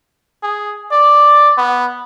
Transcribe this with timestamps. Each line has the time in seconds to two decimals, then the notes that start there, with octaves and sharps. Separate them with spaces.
0.43 G#4
0.92 D5
1.58 B3